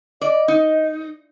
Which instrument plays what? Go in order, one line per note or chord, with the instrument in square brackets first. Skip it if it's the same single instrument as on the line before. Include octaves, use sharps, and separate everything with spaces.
[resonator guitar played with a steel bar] D5 [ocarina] D#5
[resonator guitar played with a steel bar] D#4